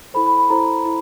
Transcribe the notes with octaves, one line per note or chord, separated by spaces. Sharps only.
E4 A4 C5 B5
B5
B5
E4 A4 C5 A#5
E4